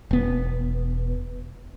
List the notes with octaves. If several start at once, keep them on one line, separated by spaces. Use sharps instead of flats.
E1 B3